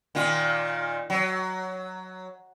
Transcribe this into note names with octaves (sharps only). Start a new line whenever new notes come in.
A#2 D#3 F4
F#3